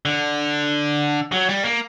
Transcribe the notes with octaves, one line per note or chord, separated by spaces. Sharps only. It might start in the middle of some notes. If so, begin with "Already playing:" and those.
D3
F#3
G3
A#3